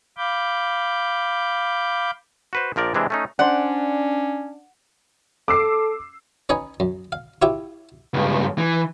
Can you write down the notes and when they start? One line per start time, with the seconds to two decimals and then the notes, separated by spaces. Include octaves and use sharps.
0.17 F5 B5 D6 G6
2.53 F#4 B4 C5
2.76 A#1 F3 A#4 D5
2.94 C3 E3 G#3 D4
3.10 A3 C#4 D#4
3.39 C#4 D4 C5 D5 F#5
5.48 A4 D6 E6 C7
6.49 C#4 D#4 B4 C#5 D#5 G#5
6.80 F#2
7.12 F5
7.42 E4 F4 G4 C#5 E5 G5
8.14 C#2 G2
8.58 E3